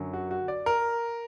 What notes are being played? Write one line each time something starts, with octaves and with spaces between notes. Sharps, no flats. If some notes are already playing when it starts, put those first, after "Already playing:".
Already playing: F#2 D3 F#3
F#4
F#4
D5
A#4